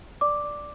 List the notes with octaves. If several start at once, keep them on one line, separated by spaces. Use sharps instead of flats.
D5 D6
D5